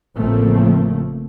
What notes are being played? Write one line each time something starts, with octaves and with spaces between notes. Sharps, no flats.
A1 C#3 F3 A3 A#3 C4